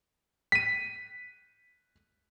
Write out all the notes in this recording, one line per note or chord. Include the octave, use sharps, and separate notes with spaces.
B6 D#7